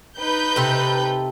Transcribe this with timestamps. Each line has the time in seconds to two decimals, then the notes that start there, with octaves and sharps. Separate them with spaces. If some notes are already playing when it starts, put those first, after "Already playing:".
0.17 D#4 B4 G6
0.56 C3 A4